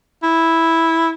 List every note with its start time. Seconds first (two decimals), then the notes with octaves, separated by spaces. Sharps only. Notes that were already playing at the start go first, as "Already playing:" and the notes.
0.23 E4